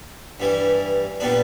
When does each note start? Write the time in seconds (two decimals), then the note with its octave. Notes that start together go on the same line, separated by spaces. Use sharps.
0.40 G2 E3 G3
1.20 A#2 G3 B3 D4